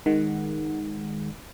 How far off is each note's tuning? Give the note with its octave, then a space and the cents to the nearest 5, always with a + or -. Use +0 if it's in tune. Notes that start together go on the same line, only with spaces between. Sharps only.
D#3 +0 G#3 -5 F#5 +0